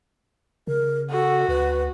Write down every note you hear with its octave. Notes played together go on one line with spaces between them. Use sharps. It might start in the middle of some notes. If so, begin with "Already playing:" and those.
C#3 A#4
F#4 A4
D2 B4